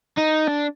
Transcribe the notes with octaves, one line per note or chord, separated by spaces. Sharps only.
D#4
D4